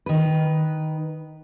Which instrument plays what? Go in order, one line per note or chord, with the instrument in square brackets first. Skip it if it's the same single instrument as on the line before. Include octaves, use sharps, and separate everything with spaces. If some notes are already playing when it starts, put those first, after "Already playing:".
[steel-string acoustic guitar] D#3 B4